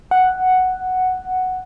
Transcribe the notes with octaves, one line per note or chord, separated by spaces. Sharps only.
F#5